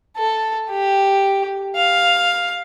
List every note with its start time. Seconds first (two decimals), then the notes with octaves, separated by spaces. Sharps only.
0.17 A4
0.70 G4
1.76 F5